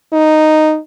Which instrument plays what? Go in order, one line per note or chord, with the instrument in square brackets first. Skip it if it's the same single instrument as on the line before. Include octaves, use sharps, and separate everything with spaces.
[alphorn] D#4